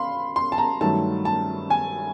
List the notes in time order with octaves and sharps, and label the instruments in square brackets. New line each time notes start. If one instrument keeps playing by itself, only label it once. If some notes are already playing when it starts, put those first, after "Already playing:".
Already playing: [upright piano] F5 B5 C6
C6
A5
A#5
G2 D#3 F#3 A3 A5
A5
G#5